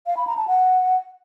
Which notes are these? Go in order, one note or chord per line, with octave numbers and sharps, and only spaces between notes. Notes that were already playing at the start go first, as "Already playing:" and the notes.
F5
B5
A#5
A5
F#5